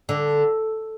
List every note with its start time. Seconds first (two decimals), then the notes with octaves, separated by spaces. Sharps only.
0.09 D3